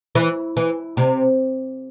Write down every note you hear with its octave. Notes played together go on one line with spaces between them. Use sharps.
E3
E3
C3